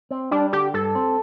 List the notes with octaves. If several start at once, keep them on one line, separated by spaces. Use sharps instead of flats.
C4
G3 D4
D3 G4
G2 A4
C4